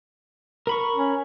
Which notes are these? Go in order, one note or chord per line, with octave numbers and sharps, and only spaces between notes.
A#4 B5 C#6
C#4